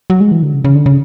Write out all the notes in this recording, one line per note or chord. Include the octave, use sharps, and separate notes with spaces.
F#3
G#3
E3
D3
C#3
C#3
D3
C#3